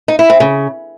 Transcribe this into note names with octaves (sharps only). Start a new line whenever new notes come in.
D#4
E4
C4
C#3